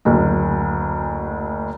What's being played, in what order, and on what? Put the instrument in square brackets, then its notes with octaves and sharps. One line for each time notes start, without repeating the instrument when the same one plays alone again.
[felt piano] F#1 D2